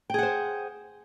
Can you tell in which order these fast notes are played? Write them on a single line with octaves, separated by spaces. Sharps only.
G5 G#4 F#5 C5